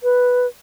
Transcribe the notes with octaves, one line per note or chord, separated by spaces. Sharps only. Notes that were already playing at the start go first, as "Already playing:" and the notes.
B4